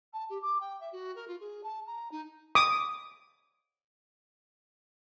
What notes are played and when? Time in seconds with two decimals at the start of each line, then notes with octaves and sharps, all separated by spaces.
0.13 A5
0.29 G4
0.42 D6
0.60 G5
0.80 E5
0.92 F#4
1.15 A#4
1.27 F4
1.40 G#4
1.63 A5
1.87 A#5
2.11 D#4
2.55 D6 D#6